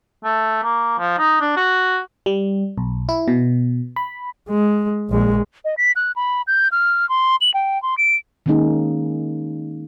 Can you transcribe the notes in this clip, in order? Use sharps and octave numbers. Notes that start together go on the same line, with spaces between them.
A3
A#3
F3
D#4
D4
F#4
G3
B1
E4
B2
B5
G#3
A#1 G#3
D#5
B6
F#6
B5
G6
F6
C6
F#7
G5
C6
D7
D#3 G#3 A#3 C#4 D#4 G#4